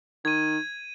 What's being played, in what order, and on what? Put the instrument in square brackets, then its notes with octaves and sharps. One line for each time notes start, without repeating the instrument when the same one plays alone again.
[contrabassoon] D#3 [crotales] G#6 D#7